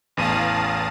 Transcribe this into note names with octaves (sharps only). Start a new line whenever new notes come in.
A1 E2 F5 A5 D#6 D#7